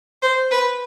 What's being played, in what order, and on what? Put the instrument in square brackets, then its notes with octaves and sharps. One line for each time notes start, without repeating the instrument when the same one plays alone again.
[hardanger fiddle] C5
B4